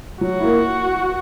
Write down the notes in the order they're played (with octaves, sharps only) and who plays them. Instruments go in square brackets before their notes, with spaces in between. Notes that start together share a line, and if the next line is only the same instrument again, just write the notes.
[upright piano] F#3 [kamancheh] F#4
[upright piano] A#3 E4